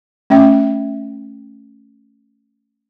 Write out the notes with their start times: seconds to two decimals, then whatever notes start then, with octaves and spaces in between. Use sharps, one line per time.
0.30 A3 C#4 E5 G5